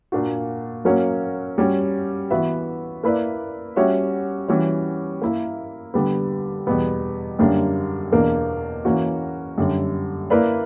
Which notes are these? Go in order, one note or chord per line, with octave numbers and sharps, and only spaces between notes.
A#2 A#3 D4 F#4
F#3 A#3 C#4 F#4 C#5
G3 C#4 F#4
E3 B3 F#4 B4 E5
A#3 E4 B4 D5
G3 C#4 F#4 C#5 E5
E3 G3 C#4 F#4 C#5
A#3 E4 A#4
D3 G3 B3
E2 B2 G3 B3
F#2 D3 G3 A#3 D4
E2 B2 A#3 D4 A#4
E3 A#3 C#4 F#4
F#2 D3 G3
A#3 E4 B4 D5